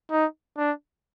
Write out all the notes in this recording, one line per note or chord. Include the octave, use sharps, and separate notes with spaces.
D#4
D4